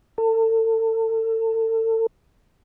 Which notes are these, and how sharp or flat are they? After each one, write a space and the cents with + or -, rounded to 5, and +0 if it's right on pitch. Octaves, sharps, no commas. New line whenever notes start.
A4 +35